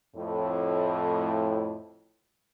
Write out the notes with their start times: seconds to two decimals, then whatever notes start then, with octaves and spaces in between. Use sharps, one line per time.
0.16 F2 A2